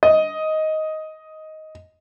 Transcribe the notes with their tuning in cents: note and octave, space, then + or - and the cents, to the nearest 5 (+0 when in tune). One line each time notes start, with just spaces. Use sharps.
D#5 +10